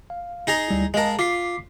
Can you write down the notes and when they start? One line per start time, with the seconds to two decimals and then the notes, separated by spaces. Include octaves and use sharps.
0.10 F5
0.47 D#4 G#4 A#5
0.68 D2 G3 E4
0.94 G#3 A#4 D#5 F5 A5
1.19 F4 D6 B6 C7